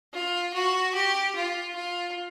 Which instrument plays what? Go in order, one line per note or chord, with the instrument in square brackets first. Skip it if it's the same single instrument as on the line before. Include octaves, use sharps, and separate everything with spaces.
[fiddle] F4
F#4
G4
F4
F4